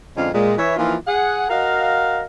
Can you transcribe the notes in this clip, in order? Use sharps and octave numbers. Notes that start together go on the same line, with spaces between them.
F2 D3 G#3 C#4 D4 F5
A#2 G#3
E3 C#5 E5
E3 F3 A#3 D#4 F4
G#4 F#5
F#4 A#4 D#5 F5